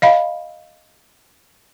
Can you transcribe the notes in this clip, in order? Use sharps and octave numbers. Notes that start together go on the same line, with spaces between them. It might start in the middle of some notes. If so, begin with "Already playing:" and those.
D#5 F5 B5